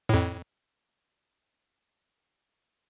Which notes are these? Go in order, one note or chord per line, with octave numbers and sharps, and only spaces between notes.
F2 A2